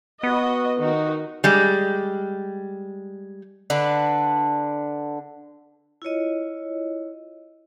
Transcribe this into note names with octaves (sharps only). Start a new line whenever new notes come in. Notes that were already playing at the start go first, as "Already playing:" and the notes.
B3 F#4 D#5
D#3 D#4 F#4
G3 G#3
D3 D4 B4
E4 F4 C#5 D#5